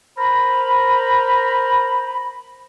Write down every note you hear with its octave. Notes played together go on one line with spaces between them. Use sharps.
A#4 C5 A#5 B5